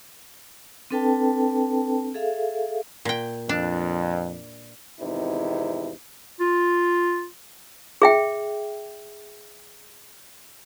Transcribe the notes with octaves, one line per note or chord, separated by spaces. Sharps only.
C4 D4 A4 B4 G5 A5
G#4 A4 E5 F5
A#2 G5
F2 D4
G#1 E2 C3 D#4 E4
F4
G#4 E5 G5